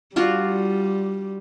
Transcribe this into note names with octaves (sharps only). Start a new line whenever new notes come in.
G3 D4 F4 F#4